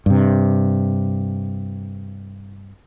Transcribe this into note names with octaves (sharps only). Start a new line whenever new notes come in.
G2 C3